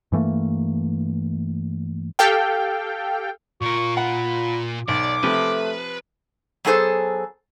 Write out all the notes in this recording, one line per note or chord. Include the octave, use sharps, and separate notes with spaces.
G2 E3 A3 A#3
G4 A4 F5 G5
A#2 F4 A#4 C#6
F#5 B5
B1 D5 D6
C3 F3 A3 B4
F#3 B3 G#4 A4 C5